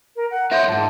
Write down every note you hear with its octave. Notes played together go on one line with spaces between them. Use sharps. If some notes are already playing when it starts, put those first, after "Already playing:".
A#4
F#5
F4 C#5 E5 F#5 C6 G6
F2 G#2 A5